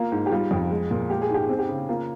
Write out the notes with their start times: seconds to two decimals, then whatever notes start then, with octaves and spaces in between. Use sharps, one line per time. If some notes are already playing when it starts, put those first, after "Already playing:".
Already playing: A#3 F4
0.12 G#2
0.26 G4
0.31 G3 F4
0.51 F2
0.71 G#3
0.91 A#2
1.10 G#3 G4
1.22 G#4
1.30 G#2 G4
1.46 C4 G#4
1.59 G4
1.69 C#3
1.89 A#3 F4